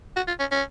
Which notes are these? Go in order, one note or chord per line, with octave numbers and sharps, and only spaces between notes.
F#4
F4
C#4
C#4